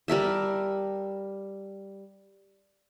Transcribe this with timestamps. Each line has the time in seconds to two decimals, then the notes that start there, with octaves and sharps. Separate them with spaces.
0.08 G3 A#4 E5 A5